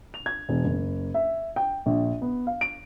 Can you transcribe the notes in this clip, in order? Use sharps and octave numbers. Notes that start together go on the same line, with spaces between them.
F7
G#6
E1
F#1
E5
G5
A#1
B3
F5
D7